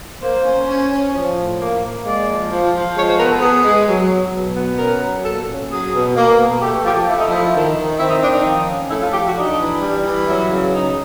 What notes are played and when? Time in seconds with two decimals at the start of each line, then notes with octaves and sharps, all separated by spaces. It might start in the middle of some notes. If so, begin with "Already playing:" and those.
0.22 A#3 C5
0.44 C#4
0.67 C#4
0.91 C#4
1.14 F3
1.37 A2
1.59 A#3
1.82 A#3
2.04 G#3 D5
2.27 F3
2.51 F3
2.74 F3
2.96 G#3 C#5
3.07 C5
3.18 B3 A#4
3.30 A4
3.41 B3 G#4
3.64 G#3
3.88 F#3
4.11 F#3
4.33 B2
4.56 B3
4.79 C#4 A#4
5.01 F#3
5.25 A#2 A4
5.48 C#4
5.70 F#3 G#4
5.93 B2
6.16 A#3
6.38 B2
6.62 A3 G4
6.84 F3 G4
7.07 A3 E4
7.17 D#4
7.28 F3 E4
7.54 D#3
7.76 D#3
7.99 C4 E4
8.10 D#4
8.21 D#3 D4
8.33 D#4
8.45 F3
8.68 C#4
8.90 A3 E4
9.01 F4
9.13 F3 G4
9.25 F#4
9.36 D4 D#4
9.59 E3
9.82 G3
10.05 E3
10.27 F#3 E4
10.51 C#3
10.74 C#3 D#4